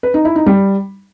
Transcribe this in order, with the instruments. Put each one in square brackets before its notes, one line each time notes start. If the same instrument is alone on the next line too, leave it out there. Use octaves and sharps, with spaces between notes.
[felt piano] B4
D#4
E4
D#4
G3